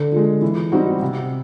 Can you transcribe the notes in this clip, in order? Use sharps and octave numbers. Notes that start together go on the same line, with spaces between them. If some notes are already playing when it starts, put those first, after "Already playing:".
Already playing: D3
F3 G#3
E3
G3 C4 D#4 F#4
C3